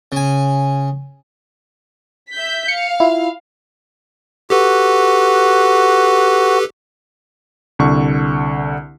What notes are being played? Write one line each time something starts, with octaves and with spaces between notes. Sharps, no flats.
C#3 G#5
E5 G6 B6
F5 C#7
E4 F4
F#4 G4 A4 B4
C2 D3 C#6